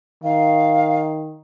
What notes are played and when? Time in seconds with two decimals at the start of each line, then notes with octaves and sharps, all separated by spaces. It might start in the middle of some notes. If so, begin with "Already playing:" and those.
0.24 D#3 F5